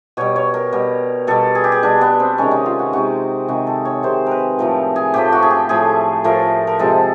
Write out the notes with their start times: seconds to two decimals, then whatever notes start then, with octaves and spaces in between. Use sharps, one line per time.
0.17 B2 G3 C#5
0.36 C#5
0.54 A#4
0.72 B2 G3
1.27 B2 G3 A4
1.55 G#4
1.64 G4
1.72 G#4
1.83 B2 G3 D4
2.01 B3
2.20 C4
2.38 C3 D#3 G#3 C#4
2.51 D#4
2.66 F4
2.79 F#4
2.93 C3 D#3 G#3 F#4
3.48 C3 D#3 G#3 F#4
3.67 A4
3.85 C#5
4.03 C3 D#3 G#3 C5
4.26 A#4 B4
4.59 A2 F3 A3 A#4
4.96 G#4
5.14 A2 F3 A3 G4
5.32 F#4
5.42 G#4
5.51 G4
5.69 A2 F3 A3 G#4
6.24 A2 F3 A3 A#4
6.67 A#4
6.79 C3 F3 G#3 A4